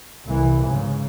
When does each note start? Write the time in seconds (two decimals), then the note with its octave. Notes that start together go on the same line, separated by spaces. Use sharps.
0.25 C2 E3
0.65 G#2 C#3